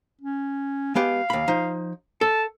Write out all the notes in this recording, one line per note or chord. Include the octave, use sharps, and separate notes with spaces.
C#4
G#3 B3 G4 F5
D#2 B5
F3 D#4
A4 A5